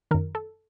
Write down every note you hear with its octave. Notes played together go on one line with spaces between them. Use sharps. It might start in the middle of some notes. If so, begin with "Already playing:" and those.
F#2 D#3 A#4
A4